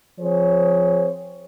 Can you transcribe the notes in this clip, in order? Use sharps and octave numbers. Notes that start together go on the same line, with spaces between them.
F3 C4 G#4 C5 C#5